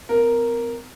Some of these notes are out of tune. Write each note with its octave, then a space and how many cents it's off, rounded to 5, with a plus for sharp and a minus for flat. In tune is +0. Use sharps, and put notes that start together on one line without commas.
C4 -45 A#4 +0